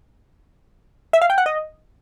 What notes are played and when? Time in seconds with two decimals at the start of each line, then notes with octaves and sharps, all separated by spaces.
1.13 E5
1.21 F5
1.30 G5
1.38 F#5
1.46 D#5